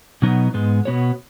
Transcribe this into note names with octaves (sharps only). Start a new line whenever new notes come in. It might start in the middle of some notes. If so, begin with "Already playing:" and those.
B2 F#3 B3 D#4
G#2 G#3 B3
B2 B3 F#4 C#5